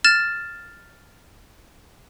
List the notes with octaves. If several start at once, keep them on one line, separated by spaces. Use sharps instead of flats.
F6 A6 E7